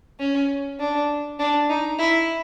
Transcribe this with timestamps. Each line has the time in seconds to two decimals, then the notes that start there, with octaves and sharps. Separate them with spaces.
0.19 C#4
0.80 D4
1.39 D4
1.69 D#4
1.99 E4